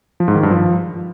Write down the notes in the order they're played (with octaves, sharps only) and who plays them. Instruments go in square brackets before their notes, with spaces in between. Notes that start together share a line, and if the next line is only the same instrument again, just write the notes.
[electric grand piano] F3
G#2
D#3
G2
F3